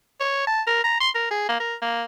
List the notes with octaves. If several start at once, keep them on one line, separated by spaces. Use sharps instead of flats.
C#5
A5
A#4
A#5
C6
A#4
G#4
A#3
A#4
A#3